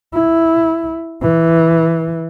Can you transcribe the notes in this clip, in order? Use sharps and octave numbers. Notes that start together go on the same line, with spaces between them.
E4
E3